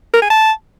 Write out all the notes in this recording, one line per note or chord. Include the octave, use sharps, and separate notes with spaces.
A#4
G#5
A5